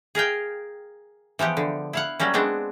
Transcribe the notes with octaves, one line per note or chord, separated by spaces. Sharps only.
G#4 A#4 F5 G5
E3 F3 B3 G4
D3
E4 F5 F#5
F#3 G3 A#3 C#4
G#3 B3 C4 D4